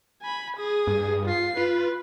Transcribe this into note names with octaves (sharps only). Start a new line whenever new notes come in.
G#5 B5
G#4 D#6
G2
F4 C7
F4 B4